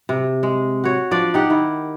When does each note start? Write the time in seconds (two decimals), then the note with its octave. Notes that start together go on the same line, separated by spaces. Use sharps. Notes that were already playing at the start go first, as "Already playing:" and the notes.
0.09 C3
0.43 G#3
0.84 F#4 C#5
1.11 F3 D4 D5
1.34 D#4 G4 F#5
1.50 D#3 E4